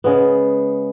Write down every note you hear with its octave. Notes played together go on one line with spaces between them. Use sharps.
C#3 G#3 B3